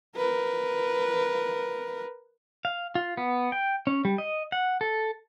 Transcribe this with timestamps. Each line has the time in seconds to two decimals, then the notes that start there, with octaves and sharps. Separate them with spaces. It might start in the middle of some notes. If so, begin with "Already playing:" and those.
0.16 A#4 B4
2.65 F5
2.95 F4
3.17 B3
3.52 G5
3.87 C#4
4.05 G3
4.18 D#5
4.52 F#5
4.81 A4